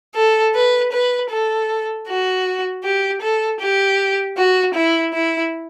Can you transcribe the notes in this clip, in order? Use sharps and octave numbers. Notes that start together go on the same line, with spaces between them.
A4
B4
B4
A4
F#4
G4
A4
G4
F#4
E4
E4